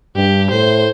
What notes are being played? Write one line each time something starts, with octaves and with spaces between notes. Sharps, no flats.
G2 G4
A2 C5